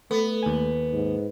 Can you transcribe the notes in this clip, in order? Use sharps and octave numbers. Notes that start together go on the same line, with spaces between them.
A3 B3 A4
D#2 G#5
G#2